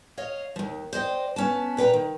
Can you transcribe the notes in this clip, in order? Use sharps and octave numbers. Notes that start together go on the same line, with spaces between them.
C#5 D#5 F5
D#2 F3
C5 D5 D#5 G5
B3 C#4 A5
A#2 B4 G5 A#5
D#3